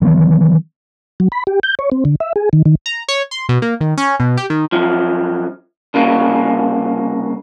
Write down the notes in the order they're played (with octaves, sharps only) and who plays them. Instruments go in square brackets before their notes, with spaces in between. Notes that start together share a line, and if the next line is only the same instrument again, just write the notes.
[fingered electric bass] D#3 E3 F#3 B3
[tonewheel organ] F#3
B5
G4
G6
C#5
C4
D3
E5
G#4
D#3
D#3
[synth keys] A#5
C#5
C6
B2
A#3
D#3
C#4
B2
G4
D#3
[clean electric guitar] F#2 F3
C2 C#3 A#3